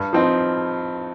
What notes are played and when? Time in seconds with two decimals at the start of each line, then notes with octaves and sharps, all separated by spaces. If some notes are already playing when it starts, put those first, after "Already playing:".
Already playing: G2
0.13 F3 C4 D#4